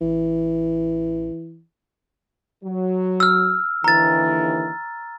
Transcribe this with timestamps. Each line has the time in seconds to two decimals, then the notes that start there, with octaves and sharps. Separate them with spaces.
0.01 A1 E3
2.64 F#3
3.20 E6 F6
3.84 D#2 D3 E3 A#5 A6